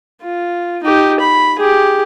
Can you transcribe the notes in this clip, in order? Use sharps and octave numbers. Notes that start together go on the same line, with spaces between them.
F4
D#4 G4
B5
G4 G#4